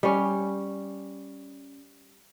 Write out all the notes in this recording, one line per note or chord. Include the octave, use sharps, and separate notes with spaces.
G3 C#4